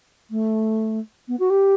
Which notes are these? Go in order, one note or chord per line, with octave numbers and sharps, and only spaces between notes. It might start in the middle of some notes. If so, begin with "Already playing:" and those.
A3
B3
F#4
G4